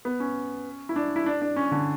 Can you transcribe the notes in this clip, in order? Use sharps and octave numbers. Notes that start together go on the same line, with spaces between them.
B3
C#4
E4
D4
E4
D4
D4
C#4
D3